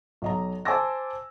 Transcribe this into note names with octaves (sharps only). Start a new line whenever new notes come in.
B1 D#5 A#5
C5 G#5 A5 D6 E6 A#6